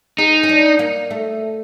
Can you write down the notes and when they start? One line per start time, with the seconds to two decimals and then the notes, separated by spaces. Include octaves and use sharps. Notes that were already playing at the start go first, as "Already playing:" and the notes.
0.18 D#4 G#4
0.43 C#4
0.49 D4
0.79 A#3
1.11 A3